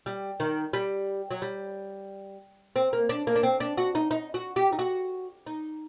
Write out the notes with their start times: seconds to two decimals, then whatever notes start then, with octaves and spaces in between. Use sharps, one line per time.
0.06 G3
0.40 D#3
0.73 G3
1.31 F#3
1.42 G3
2.76 C4
2.93 A#3
3.09 D4
3.27 A#3
3.36 D4
3.43 C4
3.60 D4
3.77 F#4
3.95 D#4
4.11 D#4
4.34 F#4
4.56 G4
4.72 D#4
4.79 F#4
5.47 D#4